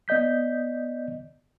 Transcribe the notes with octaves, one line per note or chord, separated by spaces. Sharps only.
B3 D5 D#5 G6 B6